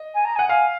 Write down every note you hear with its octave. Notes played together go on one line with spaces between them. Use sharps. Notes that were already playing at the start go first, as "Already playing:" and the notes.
Already playing: D#5
G#5
A#5
F#5 G#5
F5 G#5